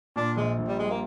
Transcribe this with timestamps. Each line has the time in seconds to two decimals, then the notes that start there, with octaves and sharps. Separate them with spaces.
0.16 A#2 D4
0.37 A#1 G#3
0.59 A#1
0.68 G3
0.79 G3 G#3
0.90 A#3